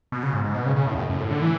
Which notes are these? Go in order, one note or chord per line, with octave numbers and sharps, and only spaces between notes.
B2
C#3
G#2
G#2
B2
C#3
C#3
A2
E2
F#2
F#2
A2
D3
E3